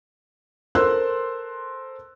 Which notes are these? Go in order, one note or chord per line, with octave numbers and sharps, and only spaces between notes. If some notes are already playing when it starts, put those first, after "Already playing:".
A4 A#4 C5 C6 E6 F#6